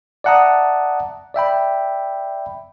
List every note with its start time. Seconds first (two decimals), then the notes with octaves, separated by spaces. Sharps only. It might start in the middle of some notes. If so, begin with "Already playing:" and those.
0.24 D5 E5 F#5 A5 A#5 D#6
1.34 D5 E5 G5 B5